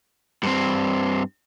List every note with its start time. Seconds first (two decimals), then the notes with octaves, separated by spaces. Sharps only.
0.43 G2 C4